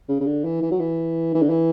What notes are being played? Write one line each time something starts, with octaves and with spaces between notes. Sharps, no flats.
C#3
C#3
D3
E3
E3
F#3
E3
E3
D3
E3